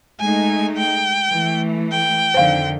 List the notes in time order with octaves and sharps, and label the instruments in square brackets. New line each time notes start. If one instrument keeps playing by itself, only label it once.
[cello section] G#3 A3 D#4 [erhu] G#5
[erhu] G5
[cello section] E3 A3
[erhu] G5
[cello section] F2 D3 D#3 [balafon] C5 F5